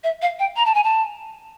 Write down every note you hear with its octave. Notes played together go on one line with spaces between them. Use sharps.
E5
F5
G5
A#5
A5
G#5
A5